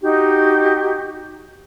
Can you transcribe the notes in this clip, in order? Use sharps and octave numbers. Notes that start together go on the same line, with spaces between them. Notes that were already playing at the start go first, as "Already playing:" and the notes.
D#4 F#4 G4